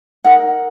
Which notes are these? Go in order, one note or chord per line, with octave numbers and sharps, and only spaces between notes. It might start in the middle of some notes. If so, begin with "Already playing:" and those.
D#4 A#4 F#5